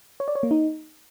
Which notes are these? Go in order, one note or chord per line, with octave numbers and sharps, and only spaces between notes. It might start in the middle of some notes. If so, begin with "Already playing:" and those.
C#5
D5
C#5
A#3
D#4